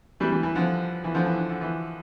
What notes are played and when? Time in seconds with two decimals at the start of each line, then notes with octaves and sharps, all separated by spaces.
0.20 E3 G3
0.32 E3 G3
0.43 E3
0.55 D3 F3
1.04 E3
1.14 D3 F3
1.25 E3
1.37 D3
1.49 D3
1.61 E3